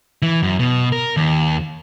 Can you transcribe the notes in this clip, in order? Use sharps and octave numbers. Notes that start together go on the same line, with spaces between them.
E3
F#2
B2
A#4
D#2